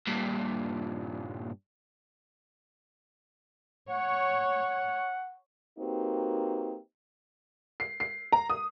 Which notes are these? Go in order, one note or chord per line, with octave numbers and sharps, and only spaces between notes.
G2 A#2
C#5 F#5
A#3 C4 D#4 F#4 G4 B4
C7
C7
A#5
D#6